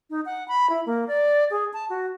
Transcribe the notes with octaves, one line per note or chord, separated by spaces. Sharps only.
D#4
F#5
B5
E4
A#3
D5
G#4
A5
F#4